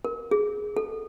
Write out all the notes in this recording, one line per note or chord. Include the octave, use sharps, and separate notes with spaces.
A#4
G#4
A4